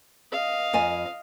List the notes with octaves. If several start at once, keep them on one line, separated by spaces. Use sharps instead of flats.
D#5 F5
F2 C5 G#5